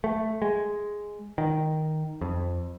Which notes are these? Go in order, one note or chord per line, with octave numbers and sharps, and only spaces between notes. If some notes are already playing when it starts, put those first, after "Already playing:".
A3
G#3
D#3
F2